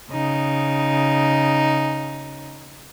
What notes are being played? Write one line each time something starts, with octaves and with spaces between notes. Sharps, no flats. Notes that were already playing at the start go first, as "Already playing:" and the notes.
C#3 D#4